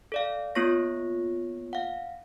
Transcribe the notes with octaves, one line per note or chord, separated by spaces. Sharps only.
A4 D5 F5
A#3 B3 F4 C#5 C#6 A#6
F5 F#5